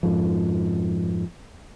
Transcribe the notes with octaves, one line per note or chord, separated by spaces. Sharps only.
F2 G#2 F3